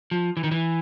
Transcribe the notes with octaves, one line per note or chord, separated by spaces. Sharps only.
F3
E3
D#3
E3